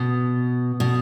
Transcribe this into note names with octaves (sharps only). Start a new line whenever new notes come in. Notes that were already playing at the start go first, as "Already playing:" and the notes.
Already playing: B2
B2